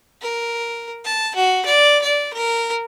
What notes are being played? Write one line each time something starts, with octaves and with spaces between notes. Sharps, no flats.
A#4
A5
F#4
D5
D5
A#4